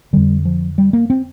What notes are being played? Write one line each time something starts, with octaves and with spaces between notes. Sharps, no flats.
F2 D3 G3
F3
G3
A#3
C4